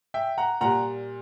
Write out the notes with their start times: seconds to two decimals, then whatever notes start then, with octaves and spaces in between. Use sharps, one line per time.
0.14 E5 G5
0.38 F#5 A#5
0.61 A#2 G3 F#5 A#5